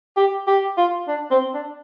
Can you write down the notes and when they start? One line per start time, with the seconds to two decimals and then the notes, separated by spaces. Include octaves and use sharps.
0.17 G4
0.47 G4
0.77 F4
1.08 D4
1.31 C4
1.54 D4